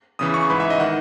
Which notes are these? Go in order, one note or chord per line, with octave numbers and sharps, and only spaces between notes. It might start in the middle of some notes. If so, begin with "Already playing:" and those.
E2 C#3 E3 D#6
C#6
G#2 E3 B5
E5
D#5
D#3 F#5